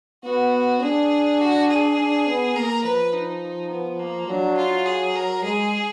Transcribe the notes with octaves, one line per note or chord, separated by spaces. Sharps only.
B3 F#4
D4 G#4
F#4
G#4
D4
B3
A#3 A#4
F3 B4
D#4
B3
A#3
F#3 D4
F4
G#4
A#4
G#3 G#4